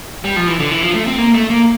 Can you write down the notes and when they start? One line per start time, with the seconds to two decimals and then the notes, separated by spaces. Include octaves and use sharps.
0.25 G3
0.36 F3
0.48 E3
0.60 D3
0.71 E3
0.83 F3
0.95 A3
1.07 C4
1.18 A#3
1.34 A3
1.50 A#3